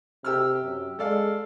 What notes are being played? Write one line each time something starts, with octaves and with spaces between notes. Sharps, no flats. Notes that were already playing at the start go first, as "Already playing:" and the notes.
C3 G4 E6 F6
F#2
G#3 A4 D5 F5